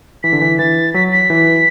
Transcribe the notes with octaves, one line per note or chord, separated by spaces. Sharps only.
E3 B6
D3
E3
E3 A6
F#3 B6
B6
E3